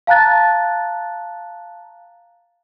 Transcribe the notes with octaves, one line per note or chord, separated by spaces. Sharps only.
F5 A5 A#5 F#6 A6